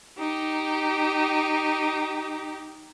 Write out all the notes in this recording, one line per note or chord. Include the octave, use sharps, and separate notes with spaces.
D#4 G4